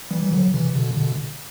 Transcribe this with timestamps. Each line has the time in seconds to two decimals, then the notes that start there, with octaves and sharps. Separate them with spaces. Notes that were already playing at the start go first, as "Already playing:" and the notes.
0.11 E3 G3
0.23 E3
0.32 D3 F#3
0.54 C3 E3
0.75 B2 D3
0.97 B2 D3